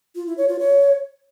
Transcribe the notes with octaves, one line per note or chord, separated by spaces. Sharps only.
F4
E4
C#5
F4
C#5